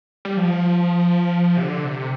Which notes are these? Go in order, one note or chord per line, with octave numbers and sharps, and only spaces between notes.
G3
F3
C3
D3
C3